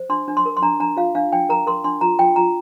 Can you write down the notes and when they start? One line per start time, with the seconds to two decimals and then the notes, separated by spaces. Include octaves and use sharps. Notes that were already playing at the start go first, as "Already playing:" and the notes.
Already playing: C5
0.09 D4 C6
0.28 D4
0.37 C6
0.46 A#4
0.57 C6
0.62 D4 A#5
0.80 D4 A#5
0.97 F4 F5
1.15 D4 F5
1.33 D4 G5
1.49 A#4 A#5
1.67 A#4 C6
1.84 D4 C6
2.01 F4 A#5
2.19 F4 G5
2.36 F4 A#5